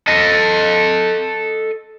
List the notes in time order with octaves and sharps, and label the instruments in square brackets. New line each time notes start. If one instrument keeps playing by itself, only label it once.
[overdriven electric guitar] A4 D#5